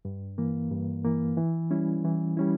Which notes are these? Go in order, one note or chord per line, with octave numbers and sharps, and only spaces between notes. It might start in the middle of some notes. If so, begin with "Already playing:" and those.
G2
E3 A#3
G2
E3 A#3
E3
G3 C#4 E4
E3
G3 C#4 E4